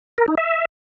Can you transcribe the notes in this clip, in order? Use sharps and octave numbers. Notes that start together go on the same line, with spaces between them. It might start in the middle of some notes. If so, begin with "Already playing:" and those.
A#4
D#4
E5